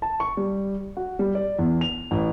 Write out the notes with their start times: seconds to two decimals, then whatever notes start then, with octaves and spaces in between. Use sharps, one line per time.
0.02 A5
0.20 C#6
0.37 G3
0.97 F#4
1.19 G3
1.35 D5
1.59 E2
1.81 F7
2.11 A1